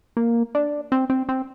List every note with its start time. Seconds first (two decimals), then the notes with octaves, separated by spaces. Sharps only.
0.17 A#3
0.55 D4
0.92 C4
1.10 C4
1.29 C4